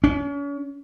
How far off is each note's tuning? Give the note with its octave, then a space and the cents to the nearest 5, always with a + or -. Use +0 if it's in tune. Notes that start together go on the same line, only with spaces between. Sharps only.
C#4 +40